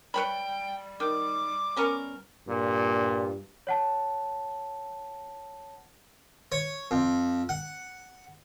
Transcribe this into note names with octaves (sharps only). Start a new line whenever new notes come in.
G3 B4 C#5 G5 B5
D#3 D6
B3 C#4 A#4
G2 A#2
C#5 F#5 A5
C#5
F2
F#5